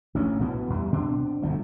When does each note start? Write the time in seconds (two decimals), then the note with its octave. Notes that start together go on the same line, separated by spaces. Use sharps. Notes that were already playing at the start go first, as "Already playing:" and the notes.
0.15 A1 D2 C#4
0.39 A#1 B2 E3 B3
0.70 E2 G3
0.92 B2 C4 D4
1.42 G1 D2 F3